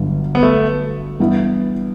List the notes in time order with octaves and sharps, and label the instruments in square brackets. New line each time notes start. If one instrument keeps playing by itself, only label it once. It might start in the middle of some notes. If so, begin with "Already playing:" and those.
Already playing: [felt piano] G1 G2 F#3
[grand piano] B3
A3
[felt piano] G2 E3 B3 E4